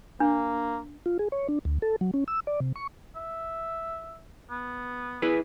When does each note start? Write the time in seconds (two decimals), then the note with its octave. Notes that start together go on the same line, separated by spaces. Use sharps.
0.20 A#3 D4
1.06 F4
1.19 G#4
1.32 C#5
1.48 D4
1.65 D2
1.82 A4
2.01 F#3
2.14 C#4
2.28 E6
2.47 D5
2.60 C3
2.76 C#6
3.16 E5
4.51 B3
5.22 E4 G#4 B4